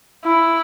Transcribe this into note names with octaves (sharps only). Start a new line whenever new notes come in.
E4